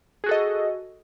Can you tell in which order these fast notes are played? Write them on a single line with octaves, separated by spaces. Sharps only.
G#4 F#4 A4 D#5